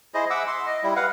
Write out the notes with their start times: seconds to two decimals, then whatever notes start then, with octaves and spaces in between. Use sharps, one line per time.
0.14 E4 G#4 C5 D#5
0.30 E5 F#5 D6 E6
0.47 C6
0.67 D#5
0.83 G3 E4
0.96 B4 F5 F#5